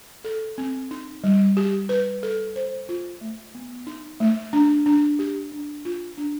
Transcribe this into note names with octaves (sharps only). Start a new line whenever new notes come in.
A4
C4
D#4
G3
G4
B4
A4
C5
F4
A3
B3
D#4
A3
D4
D4
G4
D4
F4
D4